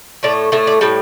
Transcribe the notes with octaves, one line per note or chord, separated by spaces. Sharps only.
A2 A3 D5
A2 A3 E5
D5
A2 G3 A4